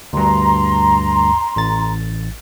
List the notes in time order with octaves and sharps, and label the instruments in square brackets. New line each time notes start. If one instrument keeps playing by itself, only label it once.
[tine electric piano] D2 G2 [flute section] A#5 C6
[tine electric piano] A1 A6